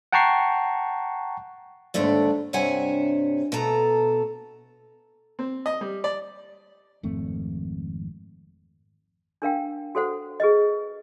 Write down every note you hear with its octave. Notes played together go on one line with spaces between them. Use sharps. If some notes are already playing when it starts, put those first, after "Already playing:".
F#5 G5 A5 A#5 C#6 C7
D#2 G#2 D3 A3 D5
G2 C3 C#5 E5 F#5 G#5
B2 A3 A4 A#5
C4
D#5
G3
D5
G#1 F2 A3 C4
D4 A#4 F5 G5
F#4 A4 C5 F#5
G#4 B4 D#5